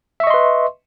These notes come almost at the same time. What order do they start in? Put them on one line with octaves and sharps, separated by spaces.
E5 C#6 D#5 C6 B4